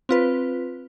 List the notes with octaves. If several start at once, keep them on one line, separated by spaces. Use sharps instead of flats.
C4 F4 B4